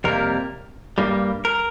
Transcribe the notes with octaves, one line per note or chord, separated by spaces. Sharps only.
F2 C3 G3 A#3 A#4
G2 G3 A#3
A#4